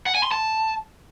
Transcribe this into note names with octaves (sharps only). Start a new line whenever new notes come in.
F#5
G#5
C6
A5